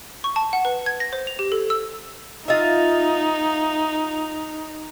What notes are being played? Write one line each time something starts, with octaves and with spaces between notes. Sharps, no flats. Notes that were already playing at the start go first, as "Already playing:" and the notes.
C#6
A5
F#5
B4
G#6
A#6
C5
F7
G4
A4
E6
D#4 F4 D#5 E5